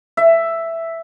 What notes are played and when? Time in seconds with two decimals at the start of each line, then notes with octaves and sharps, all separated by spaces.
0.17 E5